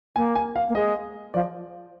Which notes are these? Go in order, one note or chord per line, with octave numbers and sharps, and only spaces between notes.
A#3 G#5
G#5
F5
A#3
G#3 D#5
F3 D5